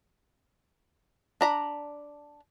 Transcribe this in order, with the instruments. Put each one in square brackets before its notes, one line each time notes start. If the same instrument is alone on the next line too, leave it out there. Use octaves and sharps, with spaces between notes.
[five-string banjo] D4 A#5 B5